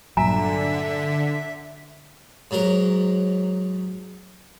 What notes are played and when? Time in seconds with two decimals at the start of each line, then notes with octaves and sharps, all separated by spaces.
0.17 G2 A#2 D3 F#3 E5 G#5 A#5
2.51 G#2 F#3 A#4